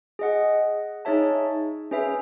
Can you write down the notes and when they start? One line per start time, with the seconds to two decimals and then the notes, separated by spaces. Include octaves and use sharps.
0.19 G#4 D#5 F#5
1.05 D#4 G#4 C#5 E5 A5
1.91 C#4 G#4 B4 E5